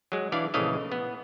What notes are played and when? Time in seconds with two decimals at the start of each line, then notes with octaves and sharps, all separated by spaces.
0.12 F#3 G#3
0.32 E3 D4 D5 F5
0.54 A#1 C#3 E3 A3 D#5 F5
0.92 B3